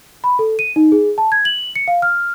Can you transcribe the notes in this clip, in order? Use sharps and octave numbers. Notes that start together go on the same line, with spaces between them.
B5
A4
D#7
D#4
G#4
A5
G#6
F#7
C#7
F5
F6